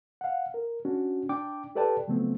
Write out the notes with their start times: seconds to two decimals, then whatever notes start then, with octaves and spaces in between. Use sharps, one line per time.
0.21 F5 F#5
0.54 A#4
0.85 C#4 D4 F#4
1.29 D4 G5 D6
1.75 G4 A4 B4 D5 G5 A5
2.08 C#3 F3 F#3 A3 B3 C4